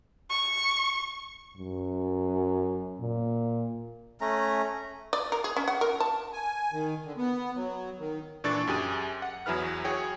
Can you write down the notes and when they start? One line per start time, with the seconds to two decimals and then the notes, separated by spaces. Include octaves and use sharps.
0.30 C#6
1.57 F#2
3.00 A#2
4.21 A3 C#4 A#5
5.13 D5
5.32 A#4
5.44 G#4
5.56 C#4
5.68 F#5
5.81 A#4
6.00 A5
6.33 G#5
6.73 D#3
7.04 D3
7.17 B3
7.56 F#3
7.99 D#3
8.44 A#2 E3 D4 A4 C#6 A6
8.67 F#2 G4 G#4 D#7
9.22 F#5
9.46 E2 F#3 E4 G#4 B4 F6
9.84 F#4 G#4 C#5 G5